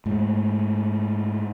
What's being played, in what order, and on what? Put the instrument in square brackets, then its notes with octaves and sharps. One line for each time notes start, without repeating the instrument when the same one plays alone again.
[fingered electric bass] G#2 A3